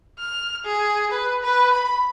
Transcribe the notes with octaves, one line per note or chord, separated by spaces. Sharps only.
F6
G#4
B4
B4
B5